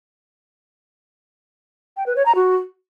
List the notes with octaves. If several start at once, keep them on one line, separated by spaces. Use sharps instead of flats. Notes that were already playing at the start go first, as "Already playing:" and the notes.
G5
B4
C#5
A#5
F#4